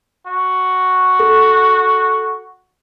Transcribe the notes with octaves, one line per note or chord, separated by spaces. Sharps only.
F#4
A4